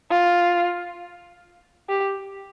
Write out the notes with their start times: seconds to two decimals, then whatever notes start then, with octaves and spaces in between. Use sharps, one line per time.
0.10 F4
1.89 G4